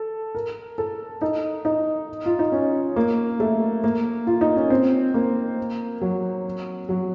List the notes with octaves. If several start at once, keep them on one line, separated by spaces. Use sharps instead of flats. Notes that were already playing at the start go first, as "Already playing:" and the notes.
Already playing: A4
A#4
A4
D#4
D#4
F4
D#4
C#4
A#3
A3
A#3
F4
D#4
C#4
C4
A#3
F#3
F#3